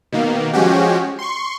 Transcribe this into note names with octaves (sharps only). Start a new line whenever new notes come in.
B2 D#3 A#3
F3 G#3 C#4 F#4 G4
C6 C#6